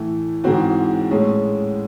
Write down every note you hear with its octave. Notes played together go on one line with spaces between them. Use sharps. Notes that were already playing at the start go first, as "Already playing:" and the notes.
Already playing: A2 E3 A3
G#2 E3 G#3 C4 F#4
A2 G#3 C#4